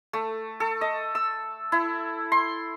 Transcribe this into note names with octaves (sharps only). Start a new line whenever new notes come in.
A3
A4
D#5
E6
E4
C6